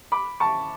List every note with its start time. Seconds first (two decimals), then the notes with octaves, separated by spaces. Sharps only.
0.12 B5 D6
0.40 A5 C#6